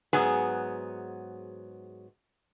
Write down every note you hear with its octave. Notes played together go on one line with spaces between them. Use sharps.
G#2 F#3 B3 G#4 G#5